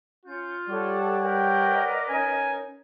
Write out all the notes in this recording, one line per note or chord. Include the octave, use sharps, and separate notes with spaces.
C#4 F4 G6
G3 G4 A4 C#5 D5 F#5
A#4 B4 D#5 G5
C#4 D#4 G#5